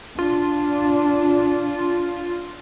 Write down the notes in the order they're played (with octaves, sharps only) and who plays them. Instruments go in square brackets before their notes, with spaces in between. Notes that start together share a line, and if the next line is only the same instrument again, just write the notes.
[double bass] D4 [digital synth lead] F4